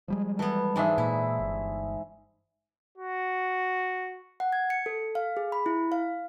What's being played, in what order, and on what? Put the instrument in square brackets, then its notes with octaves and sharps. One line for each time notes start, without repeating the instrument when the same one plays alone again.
[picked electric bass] F3 G3 G#3
[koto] E3 B3 [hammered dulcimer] A4
[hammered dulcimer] G#2 G#4 E5 [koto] E3 D4
[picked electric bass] A#2 [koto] E4
[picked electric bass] G1
[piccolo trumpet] F#4
[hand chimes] F#5
G#6
C#7
A4
F5
G#4
B5
E4
F5